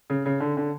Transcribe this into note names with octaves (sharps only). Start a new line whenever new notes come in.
C#3
C#3
D3
D3